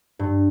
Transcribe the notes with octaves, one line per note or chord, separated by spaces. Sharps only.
G2